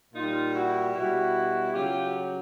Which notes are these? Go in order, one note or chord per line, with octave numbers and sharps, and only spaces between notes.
A#2 G3 D#4 F4
E4 F#4
B2 G3 E4 F#4
C#3 F#3 F4 G4